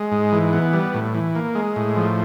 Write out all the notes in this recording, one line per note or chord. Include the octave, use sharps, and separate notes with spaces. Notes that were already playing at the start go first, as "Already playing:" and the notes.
Already playing: G#3
G#2
E3
B3
G3
A2
E3
A#3
G#3
A2
F3